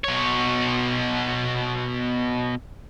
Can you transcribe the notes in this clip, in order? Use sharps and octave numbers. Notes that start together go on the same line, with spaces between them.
B2 C#5